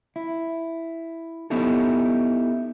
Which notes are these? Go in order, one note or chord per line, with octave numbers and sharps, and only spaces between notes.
E4
B3 C#4 D#4 E4 G4 A4